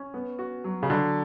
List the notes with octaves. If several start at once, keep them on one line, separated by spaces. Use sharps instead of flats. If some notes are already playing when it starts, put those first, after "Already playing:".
Already playing: C#4
B3
F#4
F#3
C#3
D3 F#3